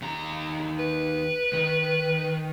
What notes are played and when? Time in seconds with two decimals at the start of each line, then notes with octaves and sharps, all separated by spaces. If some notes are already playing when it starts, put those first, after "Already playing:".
0.02 D#2 A#5
0.79 B4
1.53 D#3